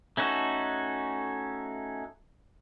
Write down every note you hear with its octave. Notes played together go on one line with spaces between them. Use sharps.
A3 C#4 D#4 F#4 A4